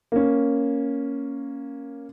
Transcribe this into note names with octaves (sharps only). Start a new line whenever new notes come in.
A#3 C#4